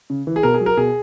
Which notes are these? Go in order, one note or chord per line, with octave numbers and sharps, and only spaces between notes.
C#3
E3
G#4
B2 A#4
G#4
F#3
A#4
B2 G#4